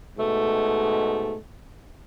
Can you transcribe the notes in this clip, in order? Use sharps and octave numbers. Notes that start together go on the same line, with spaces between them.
G#2 B2 A3